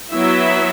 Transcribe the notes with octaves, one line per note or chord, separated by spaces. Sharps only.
F#3 B3 E4 E5